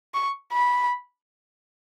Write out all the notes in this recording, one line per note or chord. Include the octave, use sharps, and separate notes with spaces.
C#6
B5